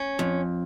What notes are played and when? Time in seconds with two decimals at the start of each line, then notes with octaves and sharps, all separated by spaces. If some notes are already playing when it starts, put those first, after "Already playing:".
Already playing: C#4
0.19 F2